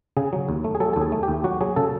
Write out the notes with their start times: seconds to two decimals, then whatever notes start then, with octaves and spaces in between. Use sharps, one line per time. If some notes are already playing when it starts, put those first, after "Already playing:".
0.17 C#3 G#4
0.33 F#3
0.49 D#2
0.64 A3
0.75 G#4
0.80 F#3 A4
0.93 D#2 A4
1.01 G#4
1.12 A3
1.23 G4
1.28 D#2
1.44 F#3 F#4
1.61 F#3 G#4
1.76 C#3 A4